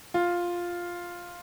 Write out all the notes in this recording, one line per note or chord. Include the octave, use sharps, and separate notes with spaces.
F4